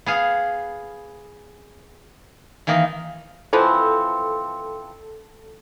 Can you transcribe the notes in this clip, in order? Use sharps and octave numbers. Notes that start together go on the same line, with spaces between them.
B3 G#4 F5
D#3 E3 A#3 D#4
E3 F3 C4 A4